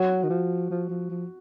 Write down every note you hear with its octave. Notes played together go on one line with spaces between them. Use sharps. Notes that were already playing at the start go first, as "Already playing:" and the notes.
Already playing: F#3 F#4
D#3
F3
F3
F3
F3